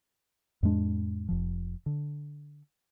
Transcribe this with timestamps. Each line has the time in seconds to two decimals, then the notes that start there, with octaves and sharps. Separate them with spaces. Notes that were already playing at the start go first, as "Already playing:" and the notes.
0.63 F2 A2 G#3 D4
1.29 F1 F3
1.86 D3